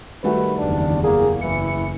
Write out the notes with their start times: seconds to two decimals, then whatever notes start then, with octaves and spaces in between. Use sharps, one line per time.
0.24 D#3 G3 A3 F#4 B4
0.58 F#1 E2 D4
1.03 A#3 G#4
1.41 F#1 E3 C#7